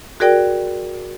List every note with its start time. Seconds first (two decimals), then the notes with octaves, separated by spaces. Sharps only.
0.20 F#4 G#4 A#4 D5 G5